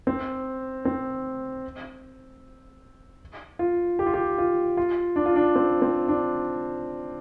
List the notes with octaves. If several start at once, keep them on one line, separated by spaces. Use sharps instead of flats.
C4
C4
F4
G4
F4
G4
F4
F4
D4
F4
D4
C4
C4
D4